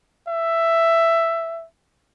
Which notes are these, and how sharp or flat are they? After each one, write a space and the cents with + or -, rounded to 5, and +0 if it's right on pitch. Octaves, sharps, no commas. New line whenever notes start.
E5 +10